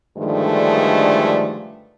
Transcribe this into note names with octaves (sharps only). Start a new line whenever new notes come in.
G2 D3 D#3 F3 G#3 A3